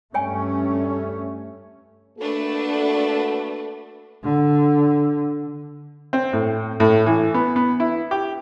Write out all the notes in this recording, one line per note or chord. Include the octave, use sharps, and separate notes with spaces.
G2 A3 C#4 C#5 G5 G#5
A3 A#3 D4 F#4 A4 B4
D3
C4
A2
A2
E3
B3
B3
E4
G4